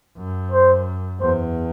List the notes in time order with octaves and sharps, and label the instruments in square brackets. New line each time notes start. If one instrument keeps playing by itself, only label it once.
[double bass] F#2
[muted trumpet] C5
[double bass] E2 [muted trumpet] C5